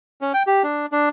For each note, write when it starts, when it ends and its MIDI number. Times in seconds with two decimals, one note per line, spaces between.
0.21 0.32 61
0.34 0.43 79
0.47 0.63 67
0.63 0.86 62
0.92 1.09 62